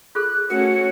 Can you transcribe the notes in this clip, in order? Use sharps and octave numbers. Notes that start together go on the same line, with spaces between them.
F4 G#4 A4 F#6
A3 C#4 F#4 A#4 C#7